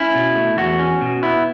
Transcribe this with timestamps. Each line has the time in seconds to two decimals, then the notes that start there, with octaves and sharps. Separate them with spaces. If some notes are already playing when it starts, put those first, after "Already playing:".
Already playing: C#4 E4
0.15 B2
0.35 A3
0.57 E2 F#4
0.79 C#4
1.01 B2
1.23 B3 E4